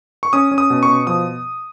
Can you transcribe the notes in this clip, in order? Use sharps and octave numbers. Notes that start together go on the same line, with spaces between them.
C#6
C#4 D#6
C#4
D#6
B2
C#6
B2
F3 D#6